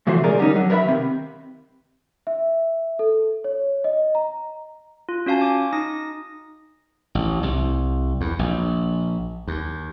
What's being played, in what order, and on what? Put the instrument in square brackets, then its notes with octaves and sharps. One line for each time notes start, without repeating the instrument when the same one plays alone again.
[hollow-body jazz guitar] C3 E3 F3 A3 F#4 C5
C#2 B2 G#4 A#4 D5
G2 D3 G3 C#4 D#4
G2 F#3
A#4 B4 C#5 E5 B5
D#2 C3
[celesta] E5
A4
C#5
D#5
A#5
[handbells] F4
C#4 F#4 F5 G#5 A5
G#5 D6
D#4 D#6 A#6
[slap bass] A1
C2
E2
A#1
D#2